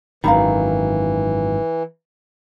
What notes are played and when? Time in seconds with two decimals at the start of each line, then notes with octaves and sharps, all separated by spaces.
0.24 G#1 F#2 D#3 E3 F5 A#5 B5